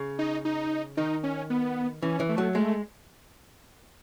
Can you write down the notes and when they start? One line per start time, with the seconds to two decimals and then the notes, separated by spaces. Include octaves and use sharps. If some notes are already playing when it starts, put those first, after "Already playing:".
Already playing: C#3
0.19 D#4
0.45 D#4
0.97 D#3 D#4
1.23 C#4
1.50 B3
2.02 E3 C#4
2.20 E3
2.29 A3
2.38 F#3
2.55 G#3 A3